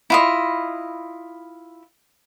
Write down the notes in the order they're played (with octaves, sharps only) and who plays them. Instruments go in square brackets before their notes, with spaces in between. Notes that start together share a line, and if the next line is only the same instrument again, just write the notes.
[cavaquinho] E4 F4 D#5